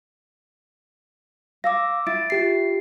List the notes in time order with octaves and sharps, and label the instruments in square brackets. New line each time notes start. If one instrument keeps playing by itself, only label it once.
[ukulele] F5 [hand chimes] D6 E6 A#6
[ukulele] E4 [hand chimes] A6 D7
[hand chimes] F4 G4 C7